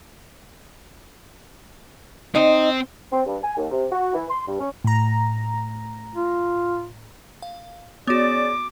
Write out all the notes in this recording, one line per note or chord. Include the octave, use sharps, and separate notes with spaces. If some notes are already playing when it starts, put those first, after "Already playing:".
C4 D#4 C5 D#5
C4
G2
G#5
D#2
C3
F#4
E3
C6
G2
C#4
A2 A#5
F4
F5
B3 C#4 F#4 G#4 D5 D6